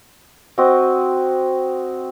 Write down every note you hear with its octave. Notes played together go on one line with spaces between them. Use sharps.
C4 F#4 D#5